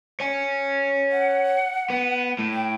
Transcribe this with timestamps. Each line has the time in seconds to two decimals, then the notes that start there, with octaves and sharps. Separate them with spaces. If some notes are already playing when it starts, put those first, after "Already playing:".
0.20 C#5 G#5
1.12 F#5
1.90 B3
2.39 A2
2.53 G5